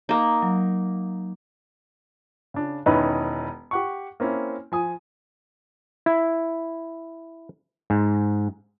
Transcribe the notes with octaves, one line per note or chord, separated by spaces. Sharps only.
A#3 D#4
F#3
C#3 D4
E1 D#3 C#4 D#4 E4 B4
G4 F#5 C#6
A#3 C4 C#4 E4
F3 G#5 D#6
E4
G#2